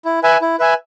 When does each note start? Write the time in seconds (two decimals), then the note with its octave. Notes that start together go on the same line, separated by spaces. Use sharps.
0.05 E4
0.23 B4 E5 G#5
0.41 E4
0.59 B4 E5 G#5